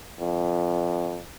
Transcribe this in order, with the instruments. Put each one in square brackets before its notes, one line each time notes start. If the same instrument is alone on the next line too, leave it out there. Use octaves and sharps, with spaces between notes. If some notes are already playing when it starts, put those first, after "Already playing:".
[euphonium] F2